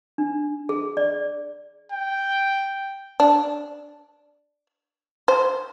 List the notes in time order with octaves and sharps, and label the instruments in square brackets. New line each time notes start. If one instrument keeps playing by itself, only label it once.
[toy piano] D4
G#4
D5
[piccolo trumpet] G5
[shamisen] D4
C5